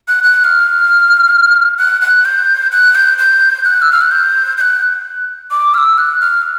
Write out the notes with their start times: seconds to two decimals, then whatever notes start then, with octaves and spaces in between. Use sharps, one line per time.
0.08 F#6
0.24 F#6
0.39 F#6
0.44 F6
1.79 F#6
2.01 F#6
2.25 G6
2.72 F#6
2.95 G6
3.18 G6
3.65 F#6
3.82 E6
3.92 F6
4.01 F#6
4.11 G6
4.58 G6
4.61 F#6
5.51 D6
5.74 F6
5.78 E6
5.98 F#6
6.21 F6